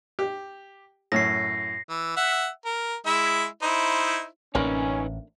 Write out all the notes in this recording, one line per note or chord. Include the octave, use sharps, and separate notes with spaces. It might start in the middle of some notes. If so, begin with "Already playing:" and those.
G4
F#2 A2 A#6 C7
E3
E5 F#5
A#4
G#3 E4 E5
D#4 E4 C5
A1 D3 A#3 C#4 D#4 A#4 B4